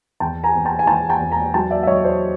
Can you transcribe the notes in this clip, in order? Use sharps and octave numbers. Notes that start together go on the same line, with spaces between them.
E2 G5 A5
G#5 A#5
E2
G5 A5
G#5
E3 G5 A5
G5 A5
E2
G#5 A#5
F#3 G5 A5
D5 E5
E5
F#3 C#5 D#5
C5 D5